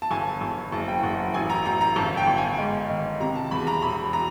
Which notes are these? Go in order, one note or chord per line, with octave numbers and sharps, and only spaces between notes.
A5
G1 G#5
G1
F#1 A5
G5
F#1 F#5
A1 G#5
A#5
A1 A#5
A#5
G1 A5
G5
G1
G#5
G#2
D#3
C3 A#5
A5
E2 B5
A#5
E1 B5
A#5